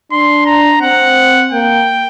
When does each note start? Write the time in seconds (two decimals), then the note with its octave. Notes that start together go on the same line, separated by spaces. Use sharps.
0.12 D4 C6
0.46 A#5
0.82 C4 F#5
1.52 A#3 G5